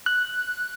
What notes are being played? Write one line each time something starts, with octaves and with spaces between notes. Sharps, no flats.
F#6